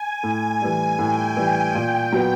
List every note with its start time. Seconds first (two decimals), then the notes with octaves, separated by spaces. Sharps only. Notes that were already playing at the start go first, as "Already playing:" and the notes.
Already playing: G#5
0.23 A2
0.61 E3 G3
0.98 A2 G5
1.37 E3 G3 G#5
1.74 A#2 G5
2.12 F#3 B3